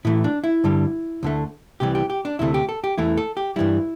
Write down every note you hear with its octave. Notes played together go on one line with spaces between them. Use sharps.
A2 E3 A3 E4
D4
E4
G2 D3 G3
D2 D3 A3
C2 C3 E3 G3 G4
G4
G4
D4
D2 C3 A3 E4
G4
A4
G4
E2 E3 A3 E4
A4
G4
G2 E3 G3 E4